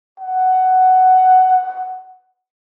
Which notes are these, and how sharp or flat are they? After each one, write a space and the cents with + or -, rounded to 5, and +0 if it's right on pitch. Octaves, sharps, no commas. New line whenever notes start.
F#5 +10